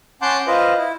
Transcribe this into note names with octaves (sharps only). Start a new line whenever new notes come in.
C#4 F#5 A5 C6 D6 G6
F4 B4 C5 D#5
E4